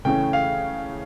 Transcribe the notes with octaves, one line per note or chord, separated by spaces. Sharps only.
C#3 E3 A3 C#4 G5
F5